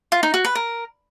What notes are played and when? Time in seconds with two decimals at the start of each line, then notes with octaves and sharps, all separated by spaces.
0.12 F4
0.23 D#4
0.34 F#4
0.45 B4
0.55 A#4